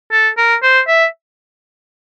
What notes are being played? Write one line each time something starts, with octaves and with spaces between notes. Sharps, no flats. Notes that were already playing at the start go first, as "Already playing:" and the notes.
A4
A#4
C5
E5